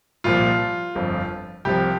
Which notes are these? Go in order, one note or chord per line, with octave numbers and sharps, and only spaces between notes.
C2 A#2 F3 F4
G1 F2 F3
C2 C3 F3 G4